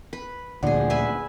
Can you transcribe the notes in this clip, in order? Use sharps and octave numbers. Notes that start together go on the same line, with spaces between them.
B4
D2 A#2 D3 F3 G#4 D5 F#5
B4 E5 G#5